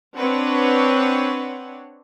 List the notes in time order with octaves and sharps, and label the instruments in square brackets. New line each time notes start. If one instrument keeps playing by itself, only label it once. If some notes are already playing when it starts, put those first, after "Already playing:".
[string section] C4 D4 B4 C#5 F#5